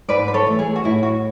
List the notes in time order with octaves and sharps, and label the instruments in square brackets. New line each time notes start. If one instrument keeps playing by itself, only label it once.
[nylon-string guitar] G#2 [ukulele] B4 D5
[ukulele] B4
A4 C#5
[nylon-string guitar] E3 A3
[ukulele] G#4
F#4
[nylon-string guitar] A2 [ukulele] E4
[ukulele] F#4